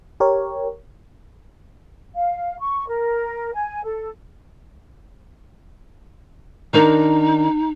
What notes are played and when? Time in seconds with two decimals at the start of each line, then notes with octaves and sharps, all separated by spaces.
0.20 G4 A#4 C#5
2.15 F5
2.60 C#6
2.88 A#4
3.54 G#5
3.84 A4
6.73 D#3 D4 D#4 A#4